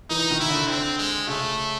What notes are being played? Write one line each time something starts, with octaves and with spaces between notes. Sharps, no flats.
E3 D#4
D#3
E4
D3
C4
G#3
C#3 A3